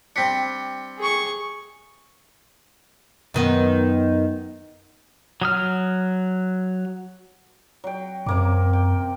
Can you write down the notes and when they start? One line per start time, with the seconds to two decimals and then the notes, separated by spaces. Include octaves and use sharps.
0.16 G3 C4 D4 B6 C#7
0.98 G#4 C#6
3.34 F#2 D#3 B3
5.42 F#3 D#6 F6
7.84 F#3 G5
8.26 F#2 C3 A#3 D6
8.73 G5